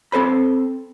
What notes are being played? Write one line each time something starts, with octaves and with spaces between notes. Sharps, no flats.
C4 A4 C5 B5